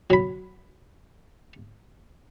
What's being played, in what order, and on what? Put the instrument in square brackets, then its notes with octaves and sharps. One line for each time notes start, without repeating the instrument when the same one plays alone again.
[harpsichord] F#3 B5